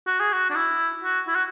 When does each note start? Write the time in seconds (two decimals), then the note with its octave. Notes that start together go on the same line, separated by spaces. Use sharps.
0.07 F#4
0.20 G#4
0.33 F#4
0.50 D4
0.55 E4
1.03 F#4
1.27 E4
1.35 F#4